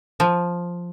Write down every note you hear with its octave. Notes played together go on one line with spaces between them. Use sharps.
F3